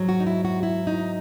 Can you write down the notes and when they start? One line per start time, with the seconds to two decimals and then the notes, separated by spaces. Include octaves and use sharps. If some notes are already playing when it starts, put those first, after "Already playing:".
Already playing: G#2 F#3
0.09 F#4
0.20 D#4
0.27 E4
0.45 F#4
0.63 E4
0.87 D#4